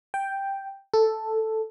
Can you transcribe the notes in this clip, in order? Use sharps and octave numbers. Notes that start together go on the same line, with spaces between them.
G5
A4